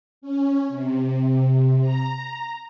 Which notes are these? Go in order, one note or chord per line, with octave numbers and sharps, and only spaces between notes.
C#4
C3
A#5